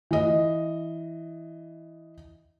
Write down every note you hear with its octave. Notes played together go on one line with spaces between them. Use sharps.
E3 D#5